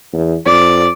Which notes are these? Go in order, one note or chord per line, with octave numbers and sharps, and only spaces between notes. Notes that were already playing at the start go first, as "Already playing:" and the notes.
E2
F2 D5